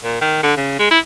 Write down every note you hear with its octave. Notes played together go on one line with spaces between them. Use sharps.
A#2
D#3
D3
C#3
G#3
E4